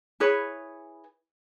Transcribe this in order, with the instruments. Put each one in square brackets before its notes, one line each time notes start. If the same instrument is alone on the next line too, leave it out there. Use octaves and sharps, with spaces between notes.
[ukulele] E4 G#4 B4 C#5